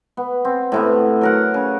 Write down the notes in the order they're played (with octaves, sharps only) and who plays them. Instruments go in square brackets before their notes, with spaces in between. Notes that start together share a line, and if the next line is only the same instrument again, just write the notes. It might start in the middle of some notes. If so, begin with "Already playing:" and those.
[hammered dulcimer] B3
C4
A2 C3 B3
F#3 A#4 F#5
C#3